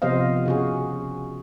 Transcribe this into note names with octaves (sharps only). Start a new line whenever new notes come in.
C3 F3 B3 C5 D#5 F5
C#3 F#4 G#4